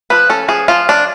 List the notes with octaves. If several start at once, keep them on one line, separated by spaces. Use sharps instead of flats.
F3 B4
C#4 A4
F3 G#4
F3 F4
D4